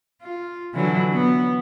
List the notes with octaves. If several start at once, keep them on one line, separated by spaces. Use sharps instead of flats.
F4
D3 E3 F#3
B3